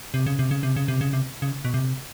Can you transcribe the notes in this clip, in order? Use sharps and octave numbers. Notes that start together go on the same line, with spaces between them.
C3
C#3
C3
C#3
C3
C#3
C3
C#3
C3
C#3
B2
C3